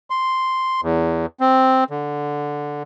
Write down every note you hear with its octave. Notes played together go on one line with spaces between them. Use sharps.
C6
E2
C4
D3